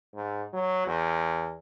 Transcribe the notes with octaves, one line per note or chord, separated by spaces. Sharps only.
G#2
F#3
E2